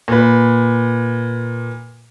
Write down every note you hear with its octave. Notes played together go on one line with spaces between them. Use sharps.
A#2 B4